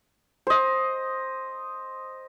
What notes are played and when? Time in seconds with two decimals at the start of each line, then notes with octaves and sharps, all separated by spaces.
0.47 C5 D#5